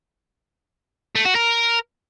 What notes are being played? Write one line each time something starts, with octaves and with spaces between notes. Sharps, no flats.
A3
F#4
A#4